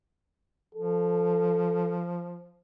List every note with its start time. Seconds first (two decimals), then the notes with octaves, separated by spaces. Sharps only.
0.75 F3 A4